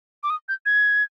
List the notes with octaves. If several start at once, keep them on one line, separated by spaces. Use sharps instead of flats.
D6
D#6
G6
G#6